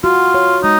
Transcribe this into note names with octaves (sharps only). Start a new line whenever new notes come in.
F4 F#4
C#5
G#3 D#4